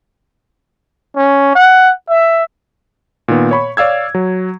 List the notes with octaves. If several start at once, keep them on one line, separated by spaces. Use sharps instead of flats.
C#4
F#5
E5
A#2 D#3 B3
C#5 B5 C#6
C#5 D5 F5 E6 G#6
F#3